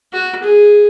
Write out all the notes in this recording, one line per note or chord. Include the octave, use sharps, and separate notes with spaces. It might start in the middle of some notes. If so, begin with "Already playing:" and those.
F#4
G#4